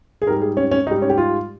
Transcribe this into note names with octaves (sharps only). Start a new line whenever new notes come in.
G#4
G#2 G3 A#4
G#4
C#4
C#4
G#2 G3 D#4
C#4
G4
F4